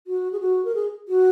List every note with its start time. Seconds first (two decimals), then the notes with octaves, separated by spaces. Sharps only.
0.07 F#4
0.32 G#4
0.41 F#4
0.65 A#4
0.75 G#4
1.08 F#4